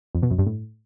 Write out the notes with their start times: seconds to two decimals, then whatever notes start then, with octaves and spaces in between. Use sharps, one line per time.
0.15 F2
0.23 B2
0.31 F#2
0.39 G2
0.47 A2